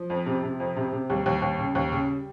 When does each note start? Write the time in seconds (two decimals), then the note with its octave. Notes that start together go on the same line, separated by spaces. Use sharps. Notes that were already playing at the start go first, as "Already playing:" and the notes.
Already playing: F3
0.10 F2
0.26 C3
0.43 C3
0.60 F2
0.76 C3
0.93 C3
1.10 D#2 G3
1.26 D#2
1.42 D#2
1.59 C#3
1.75 D#2
1.92 C#3